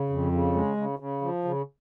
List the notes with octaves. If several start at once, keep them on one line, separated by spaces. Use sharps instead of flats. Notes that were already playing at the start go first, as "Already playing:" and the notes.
Already playing: C#3
F2
C#3
G#3
C#3
C#3
F3
C#3